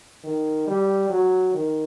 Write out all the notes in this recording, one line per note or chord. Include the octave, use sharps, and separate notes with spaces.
D#3
G3
F#3
D#3